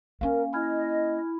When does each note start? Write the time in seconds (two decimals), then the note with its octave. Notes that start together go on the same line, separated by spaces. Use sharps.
0.21 A#3 C#4 A#4 F5 G#5
0.53 E4 D#5 G#5 F6 G#6